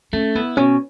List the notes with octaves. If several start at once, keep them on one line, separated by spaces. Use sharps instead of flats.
A3 C#4
B3 E4
B2 C#4